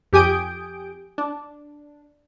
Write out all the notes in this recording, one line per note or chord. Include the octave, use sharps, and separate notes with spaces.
F2 G4 G#5 D#6 G6 D7
D4